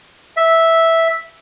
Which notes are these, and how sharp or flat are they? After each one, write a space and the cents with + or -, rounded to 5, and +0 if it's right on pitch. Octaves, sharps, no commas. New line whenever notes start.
E5 -5